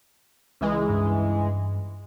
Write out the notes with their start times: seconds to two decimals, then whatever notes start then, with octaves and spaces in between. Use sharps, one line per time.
0.61 C#2 E3 G#3
0.89 G2